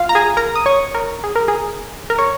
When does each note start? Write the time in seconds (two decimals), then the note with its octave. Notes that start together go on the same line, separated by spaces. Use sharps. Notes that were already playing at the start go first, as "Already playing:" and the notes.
Already playing: F4 F5
0.09 A#5
0.15 G#4 G#5
0.37 A#4 A#5
0.56 D#6
0.66 C#5 C#6
0.95 A#4
1.24 G#4
1.36 A#4
1.48 G#4
2.10 A#4
2.18 C#5